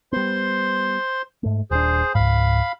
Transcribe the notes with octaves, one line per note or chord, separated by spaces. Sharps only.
G3 B3 C5 C6
G#2 A3
D#1 D4 G#4 C5
C#2 G#2 F5 B5